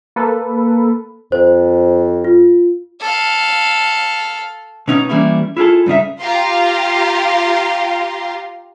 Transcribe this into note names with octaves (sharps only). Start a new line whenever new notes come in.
A#3 A4 B4
F2 C5
F4
A4 F5
B2 C#4 D#4
E3 G3 A#3 C#4 E4
E4 F4 G#4 A4
G2 C#3 D#4 E5
F4 G4 F5 A#5 C6